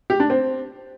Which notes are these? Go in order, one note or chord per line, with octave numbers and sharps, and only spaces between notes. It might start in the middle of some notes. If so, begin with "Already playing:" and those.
G4
D4
C4